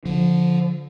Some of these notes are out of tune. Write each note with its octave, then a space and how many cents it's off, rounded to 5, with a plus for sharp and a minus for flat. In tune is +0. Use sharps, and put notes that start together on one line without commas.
D3 -15 F3 +5